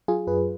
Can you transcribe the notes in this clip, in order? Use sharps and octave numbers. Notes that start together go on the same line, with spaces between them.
F#3 F4 G#4
F#2 G#4 B4